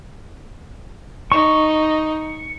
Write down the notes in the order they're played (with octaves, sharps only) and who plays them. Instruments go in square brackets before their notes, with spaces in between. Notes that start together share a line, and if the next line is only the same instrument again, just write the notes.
[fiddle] D#4 [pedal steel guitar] C#6